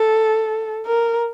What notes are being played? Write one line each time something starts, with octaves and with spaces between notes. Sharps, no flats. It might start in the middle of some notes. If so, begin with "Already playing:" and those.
Already playing: A4
A#4